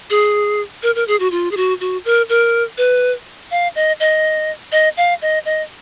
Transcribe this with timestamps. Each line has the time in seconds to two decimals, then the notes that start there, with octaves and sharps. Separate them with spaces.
0.10 G#4
0.83 A#4
0.95 A#4
1.08 G#4
1.20 F#4
1.32 F4
1.52 G#4
1.57 F#4
1.81 F#4
2.05 A#4
2.29 A#4
2.78 B4
3.51 F5
3.76 D#5
4.00 D#5
4.72 D#5
4.97 F5
5.22 D#5
5.45 D#5